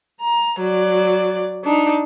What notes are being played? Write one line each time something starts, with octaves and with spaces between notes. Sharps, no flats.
A#5
F#3 D5
D4 D#4